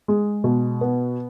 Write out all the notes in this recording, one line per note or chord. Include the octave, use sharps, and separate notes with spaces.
G#3
B2
B3